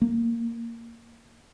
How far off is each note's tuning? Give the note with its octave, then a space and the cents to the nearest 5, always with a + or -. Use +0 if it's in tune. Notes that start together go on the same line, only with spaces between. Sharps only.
A#3 -10